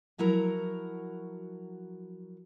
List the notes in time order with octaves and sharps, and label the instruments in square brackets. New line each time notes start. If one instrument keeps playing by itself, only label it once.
[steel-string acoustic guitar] F3 F#3 E4 F#4 A#4 A#5